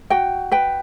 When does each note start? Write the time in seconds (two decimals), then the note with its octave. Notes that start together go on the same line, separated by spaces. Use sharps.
0.10 F#4 G5
0.52 B4 G5